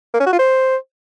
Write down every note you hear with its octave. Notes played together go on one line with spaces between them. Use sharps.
A#3
C#4
F#4
F4
C5